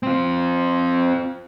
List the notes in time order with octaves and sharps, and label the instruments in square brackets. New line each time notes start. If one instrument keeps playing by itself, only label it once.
[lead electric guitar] C4 F4